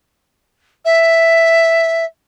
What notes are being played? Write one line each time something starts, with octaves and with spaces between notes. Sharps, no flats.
E5